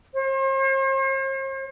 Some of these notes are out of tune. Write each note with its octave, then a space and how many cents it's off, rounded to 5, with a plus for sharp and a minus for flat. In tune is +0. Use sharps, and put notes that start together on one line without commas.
C5 +45